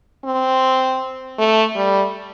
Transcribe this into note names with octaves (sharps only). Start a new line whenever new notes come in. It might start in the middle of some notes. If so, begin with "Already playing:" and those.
C4
A3
G3